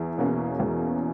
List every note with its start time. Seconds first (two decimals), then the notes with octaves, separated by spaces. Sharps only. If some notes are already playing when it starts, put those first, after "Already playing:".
Already playing: E2
0.18 B2 A#3 C#4 G#4
0.60 E2